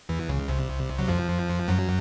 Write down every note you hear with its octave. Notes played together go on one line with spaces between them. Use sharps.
E2 E3
C#2 C#3
C2 C3
F#3
F2 F3
F#2 F#3